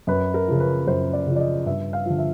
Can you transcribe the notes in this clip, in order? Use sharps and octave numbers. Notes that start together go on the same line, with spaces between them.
F#2 B4
A#4
C#3 F3
B4
F#2 C5
D5
C#3 F3
D5
D#5
G2 E5
F5
D3 F3
E5